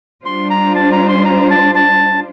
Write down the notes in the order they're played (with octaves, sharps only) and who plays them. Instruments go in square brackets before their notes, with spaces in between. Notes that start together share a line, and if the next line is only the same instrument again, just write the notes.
[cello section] G3 D4 F4 C5 [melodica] C6
[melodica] A#5
A5
A#5
C6
A#5
A5
A5